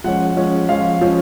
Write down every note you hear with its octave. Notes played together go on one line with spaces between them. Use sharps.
F3 G#3 C#4 F#5
F3 G#3 C#4
F3 G#3 C#4 F5
F3 G#3 C#4